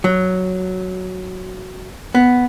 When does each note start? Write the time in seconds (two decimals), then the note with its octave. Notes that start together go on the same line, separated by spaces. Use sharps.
0.04 F#3
2.15 B3